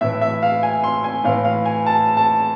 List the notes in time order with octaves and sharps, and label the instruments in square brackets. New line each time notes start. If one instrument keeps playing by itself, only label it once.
[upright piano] A2 E3 E5
E5
F5
G#5
C6
G#5
A2 E3 F5
F5
G#5
A5
A5